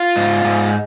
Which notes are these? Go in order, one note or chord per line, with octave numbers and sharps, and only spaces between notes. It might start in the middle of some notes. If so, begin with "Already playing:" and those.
Already playing: F4
G#2
G#2